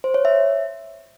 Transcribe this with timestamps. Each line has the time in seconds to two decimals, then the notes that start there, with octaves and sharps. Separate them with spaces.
0.04 C5
0.14 C#5
0.25 E5